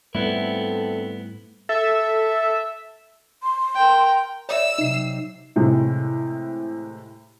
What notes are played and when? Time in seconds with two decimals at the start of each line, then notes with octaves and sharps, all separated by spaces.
0.15 D2 G#2 G3 A3 B3 C4 E4 A4
1.69 A4 E5
3.43 C6
3.75 A#4 G5
4.49 C#5 D5 E5 E6
4.78 C3 F#3 D#4 C7
5.56 A2 C3 E3 G#3